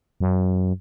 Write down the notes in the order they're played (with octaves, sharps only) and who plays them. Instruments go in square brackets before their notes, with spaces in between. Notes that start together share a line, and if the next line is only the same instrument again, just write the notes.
[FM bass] F#2